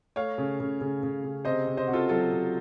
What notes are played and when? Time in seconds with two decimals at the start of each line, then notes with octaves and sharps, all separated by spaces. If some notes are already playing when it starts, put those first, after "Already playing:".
0.16 A3 C#5 F5
0.38 C#3
0.60 C#3
0.81 C#3
1.03 C#3
1.24 C#3
1.45 C3 C5 D#5
1.67 C3
1.77 C5 D#5
1.87 C3 F#4
1.93 F4 A4
2.09 F#3 F4 A4
2.31 C3